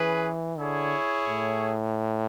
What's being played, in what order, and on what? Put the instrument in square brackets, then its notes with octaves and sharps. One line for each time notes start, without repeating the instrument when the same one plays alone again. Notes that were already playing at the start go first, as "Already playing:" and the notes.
Already playing: [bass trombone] E3 [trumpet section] C#4 G#4 B4
[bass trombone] D3 [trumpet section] E4 G#4 C#5
[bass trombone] A2